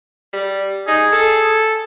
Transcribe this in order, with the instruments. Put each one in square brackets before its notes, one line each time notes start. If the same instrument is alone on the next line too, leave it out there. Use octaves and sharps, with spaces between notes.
[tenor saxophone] G3
[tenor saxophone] D#4 [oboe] G#4
[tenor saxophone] A4